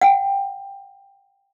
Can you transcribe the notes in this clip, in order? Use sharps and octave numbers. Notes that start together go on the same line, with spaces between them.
F#5 G5